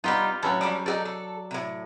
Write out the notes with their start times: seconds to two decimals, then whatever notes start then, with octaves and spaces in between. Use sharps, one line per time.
0.04 G3 B3 D#4 F4 G4
0.43 A2 F#3 C#4 A4
0.61 F3 G3 D5
0.86 D#4 G4 A4 D5
1.05 A4
1.51 A2 C3